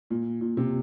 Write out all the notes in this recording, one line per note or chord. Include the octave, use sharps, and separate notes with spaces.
A#2
A#2
C3